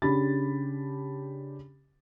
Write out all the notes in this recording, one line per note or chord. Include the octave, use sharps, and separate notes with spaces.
C#3 D4 G4 B5 A6